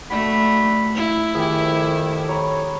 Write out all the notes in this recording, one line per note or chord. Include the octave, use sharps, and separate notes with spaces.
A3 D4 F#4 B5
E4
F2 D#3 G4 G#4
C#5 A#5 B5